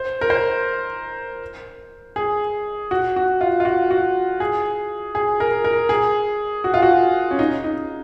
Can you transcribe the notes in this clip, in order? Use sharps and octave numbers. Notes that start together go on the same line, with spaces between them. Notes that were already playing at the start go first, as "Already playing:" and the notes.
Already playing: C5
A#4
C5
G#4
F#4
F#4
F4
F4
F#4
F#4
G#4
G#4
A#4
A#4
G#4
F#4
F4
F#4
C#4
D#4
D#4